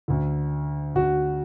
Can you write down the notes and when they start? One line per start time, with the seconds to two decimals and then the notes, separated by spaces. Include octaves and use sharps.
0.08 D2 D3
0.95 D2 D3 F#4